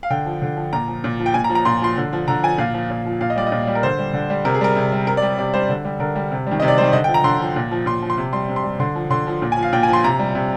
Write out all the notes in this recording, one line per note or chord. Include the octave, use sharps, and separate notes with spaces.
F5
D3 G5
F3
D3
F3
A#2 A#5
F3
A#2
F3
G5
A#2 G#5
A#5
F3
A#5
A#2 C6
F3 C6
D3
F3
D3 A#5
F3 G#5
A#2 F5
F3
A#2
F3
A#2 F5
D#5
G3 D5
D#5
A#2
G3
A#4
D3 C5
G3
D3
G3
C3 A#4
G#4
G3 A#4
C3
G3
C3 A#4
D5
G3
C3 D5
G3 C5
D3
G3
D3 A#4
G3
C3
D#3 G3
C3 D#5
D5
D#3 G3 C5
D3 D#5
G5
F3
A#5
D3 C6
F3
A#2
F3
A#2 C6
F3
C6
C3
G3 C6
C3
C6
G3
D3 C6
F3
D3 C6
F3
A#2
G#5
F3
F5
A#2 G5
G#5
F3
C6
C3 A#5
G3
C3